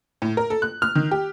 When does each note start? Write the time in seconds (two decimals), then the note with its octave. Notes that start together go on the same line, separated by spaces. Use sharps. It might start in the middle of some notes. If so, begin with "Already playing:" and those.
0.22 A2
0.37 A#4
0.50 A4
0.62 F#6
0.82 F6
0.95 D#3
1.11 G4